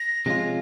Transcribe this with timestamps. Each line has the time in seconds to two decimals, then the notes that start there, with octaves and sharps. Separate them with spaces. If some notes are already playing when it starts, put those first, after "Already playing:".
Already playing: A#6
0.26 C3 F3 G#3 C#4 F4